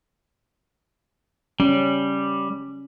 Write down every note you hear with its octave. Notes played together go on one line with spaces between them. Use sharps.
G3 C#4